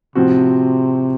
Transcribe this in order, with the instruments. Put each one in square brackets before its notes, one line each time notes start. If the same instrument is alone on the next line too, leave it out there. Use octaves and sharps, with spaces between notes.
[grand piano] A2 F3 C4 F#4 [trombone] C3